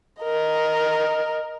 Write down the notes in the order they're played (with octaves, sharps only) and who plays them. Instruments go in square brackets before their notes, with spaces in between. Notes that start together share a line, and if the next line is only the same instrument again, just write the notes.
[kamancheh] A#4 D#5